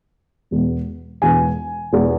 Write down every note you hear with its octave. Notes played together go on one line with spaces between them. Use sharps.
E1 E2 E3 G#3 B3
E1 E2 E3 G#3 B3 G#5
E1 E2 E3 G#3 B3